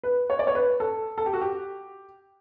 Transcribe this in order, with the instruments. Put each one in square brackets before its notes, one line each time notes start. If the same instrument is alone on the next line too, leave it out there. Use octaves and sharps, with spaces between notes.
[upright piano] B4
C#5
D5
C#5
B4
A4
A4
G4
F#4
G4